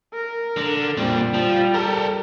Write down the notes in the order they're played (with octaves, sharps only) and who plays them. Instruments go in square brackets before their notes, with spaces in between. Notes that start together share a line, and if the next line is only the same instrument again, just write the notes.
[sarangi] A#4
[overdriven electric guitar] D3
[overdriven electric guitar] A#2 C4 [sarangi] G3
[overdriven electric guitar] F3
A4 A#4